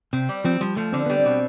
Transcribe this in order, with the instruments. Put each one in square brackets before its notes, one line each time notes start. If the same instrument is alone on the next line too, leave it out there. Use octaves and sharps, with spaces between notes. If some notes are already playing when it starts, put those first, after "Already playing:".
[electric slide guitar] C3 [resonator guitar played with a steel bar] C4
[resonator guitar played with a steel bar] G3
[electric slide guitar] F3 [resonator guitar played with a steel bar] C4
[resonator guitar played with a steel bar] F3 [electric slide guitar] G3
[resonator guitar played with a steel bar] F3 [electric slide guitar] A3
[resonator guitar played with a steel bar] D3 [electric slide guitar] C4
[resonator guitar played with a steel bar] G3 [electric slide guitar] B3
[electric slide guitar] C4
[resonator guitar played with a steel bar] B2